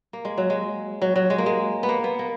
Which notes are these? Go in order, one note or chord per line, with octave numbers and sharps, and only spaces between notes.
A#3
G#3
F#3
G#3
F#3
F#3
G#3
A#3
G#3
B3
A#3
B3
A#3